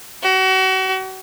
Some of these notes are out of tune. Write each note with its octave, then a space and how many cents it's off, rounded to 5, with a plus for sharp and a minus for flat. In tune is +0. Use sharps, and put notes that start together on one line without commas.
F#4 +35